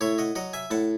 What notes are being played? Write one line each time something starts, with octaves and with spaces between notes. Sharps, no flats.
A2 C#5 E5
D#5 F#5
F#3 D#5 F#5
E5 G#5
A2 F#5 A5